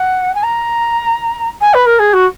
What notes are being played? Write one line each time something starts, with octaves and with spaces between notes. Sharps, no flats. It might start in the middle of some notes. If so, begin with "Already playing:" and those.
Already playing: F#5
G#5
A#5
G#5
B4
A#4
G#4
F#4